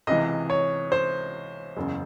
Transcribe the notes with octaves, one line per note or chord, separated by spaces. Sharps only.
C#2 C3 E3 D#5
C#5
C5
F#1 E2 C#3